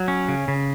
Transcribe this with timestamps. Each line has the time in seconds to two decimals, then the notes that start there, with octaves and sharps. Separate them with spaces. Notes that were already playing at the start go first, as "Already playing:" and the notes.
Already playing: F#3
0.08 C#4
0.29 C#3
0.48 C#3